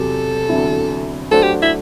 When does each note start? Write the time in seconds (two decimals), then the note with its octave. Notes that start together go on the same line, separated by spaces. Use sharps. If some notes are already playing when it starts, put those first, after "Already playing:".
Already playing: E2 C3 F#3 C4 G4 A4
0.49 E2 D3 F#3 C4 E4
1.31 F#3 A3 D4 F#4 A4 C5
1.43 G4
1.62 E4